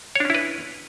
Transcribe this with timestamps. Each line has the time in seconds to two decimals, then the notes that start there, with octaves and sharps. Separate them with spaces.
0.15 C#5
0.20 D4
0.25 C#4
0.30 E4
0.35 B4